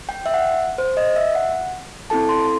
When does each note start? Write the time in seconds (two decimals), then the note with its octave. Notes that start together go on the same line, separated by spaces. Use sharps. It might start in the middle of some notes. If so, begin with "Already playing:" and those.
0.09 G5
0.26 E5
0.34 F#5
0.78 C5
0.97 D#5
1.16 E5
1.35 F#5
2.10 C4 E4 A4 A5
2.29 C6